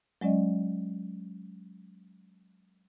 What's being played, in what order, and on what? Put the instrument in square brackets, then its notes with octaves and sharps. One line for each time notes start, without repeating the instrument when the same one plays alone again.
[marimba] F#3 G#3 C#4 D5 D#5